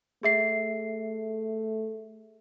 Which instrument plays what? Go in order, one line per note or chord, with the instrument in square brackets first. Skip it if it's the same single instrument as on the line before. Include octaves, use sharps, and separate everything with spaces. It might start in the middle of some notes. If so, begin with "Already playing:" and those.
[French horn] A3 [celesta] G#4 E5 C7